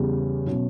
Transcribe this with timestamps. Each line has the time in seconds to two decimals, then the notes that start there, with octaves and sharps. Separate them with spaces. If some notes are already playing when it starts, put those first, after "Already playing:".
Already playing: E2 C#3 G3 B3
0.46 B2 F#3 C#4